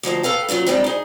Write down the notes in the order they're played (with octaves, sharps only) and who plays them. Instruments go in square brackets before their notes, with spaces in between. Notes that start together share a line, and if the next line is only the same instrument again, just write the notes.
[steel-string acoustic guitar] D2 F3 D#4 C5
A4 B4 F5 G5
G2 A#2 C#3 F#3
G3 G#3 C4 D4 D#4
D#4 G#4